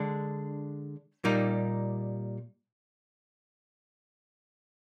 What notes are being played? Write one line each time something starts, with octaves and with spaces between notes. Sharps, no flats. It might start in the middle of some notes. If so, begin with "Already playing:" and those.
Already playing: D3 G#3 D4
A#2 G3 A#3 D#4